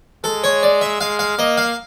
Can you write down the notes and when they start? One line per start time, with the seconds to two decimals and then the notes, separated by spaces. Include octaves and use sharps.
0.24 G#3 A4
0.44 C#5
0.63 D5
0.81 E5
1.01 G#3 F5
1.19 F5
1.38 A#3 D#5
1.58 F5